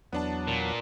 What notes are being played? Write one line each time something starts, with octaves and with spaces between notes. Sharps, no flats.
E2 F#3 B3 D4 A5
A#2